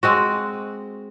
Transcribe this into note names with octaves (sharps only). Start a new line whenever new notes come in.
G#3 C4 F#4